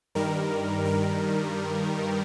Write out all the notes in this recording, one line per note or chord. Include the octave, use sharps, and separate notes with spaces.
G2 D#3 G3 A#4
A#4